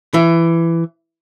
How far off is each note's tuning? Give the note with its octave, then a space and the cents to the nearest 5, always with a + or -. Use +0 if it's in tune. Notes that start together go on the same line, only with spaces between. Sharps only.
E3 +15